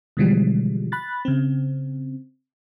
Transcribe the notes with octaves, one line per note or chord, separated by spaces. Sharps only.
B2 D3 E3 F3 G3 G#3
B5 F#6 A6
C#3 C4